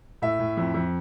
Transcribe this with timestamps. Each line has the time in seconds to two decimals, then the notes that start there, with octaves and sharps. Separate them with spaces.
0.22 A2 E5
0.39 A2
0.57 F2
0.74 F2